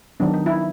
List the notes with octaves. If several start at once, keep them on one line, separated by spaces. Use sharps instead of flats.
D#3 F#3 B3 D4
D#4
E4